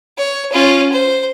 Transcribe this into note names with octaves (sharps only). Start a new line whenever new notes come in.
C#5
C#4 F4
C5